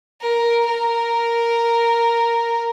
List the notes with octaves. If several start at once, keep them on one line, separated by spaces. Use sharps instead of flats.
A#4
A#4